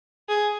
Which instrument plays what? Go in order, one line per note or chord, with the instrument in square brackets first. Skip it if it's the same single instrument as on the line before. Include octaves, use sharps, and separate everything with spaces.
[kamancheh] G#4